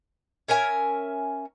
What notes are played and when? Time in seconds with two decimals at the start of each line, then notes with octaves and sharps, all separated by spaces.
0.48 C#4 A#4 E5 G#5